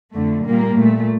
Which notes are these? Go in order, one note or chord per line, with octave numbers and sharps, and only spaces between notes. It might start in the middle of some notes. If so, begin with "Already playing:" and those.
F2 D3 A3
A#2 G3 A#3
A#2 A3